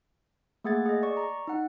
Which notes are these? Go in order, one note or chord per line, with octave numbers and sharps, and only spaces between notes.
A3 A#3 G#4 F#5 G#6 A6
G#4 D#5
D5 C#6
A#5
D#4 F#5